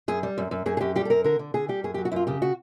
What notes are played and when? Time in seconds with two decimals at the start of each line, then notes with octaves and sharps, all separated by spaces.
0.08 F#2 G#4
0.23 G3
0.38 F#2
0.51 F#2
0.66 F#2 G#4
0.77 G#4
0.81 F#2 G4
0.96 G3 G4
1.05 A4
1.10 F#2 A#4
1.24 D3 A#4
1.39 D3
1.54 D3 G#4
1.69 G3 G4
1.84 F#2 G#4
1.94 G4
1.98 F#3
2.05 F#4
2.12 F#2 E4 F4
2.27 C#3 G4
2.42 F#4